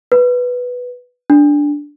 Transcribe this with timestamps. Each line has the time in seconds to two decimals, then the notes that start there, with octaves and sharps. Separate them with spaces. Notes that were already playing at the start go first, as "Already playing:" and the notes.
0.12 B4
1.30 D4